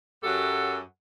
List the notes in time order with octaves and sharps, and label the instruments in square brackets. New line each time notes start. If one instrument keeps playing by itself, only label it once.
[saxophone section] F#2 F#3 G4 A4 F#5